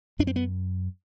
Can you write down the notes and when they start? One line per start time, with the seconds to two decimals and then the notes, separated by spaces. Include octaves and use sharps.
0.19 F#2 D4
0.27 C4
0.36 B3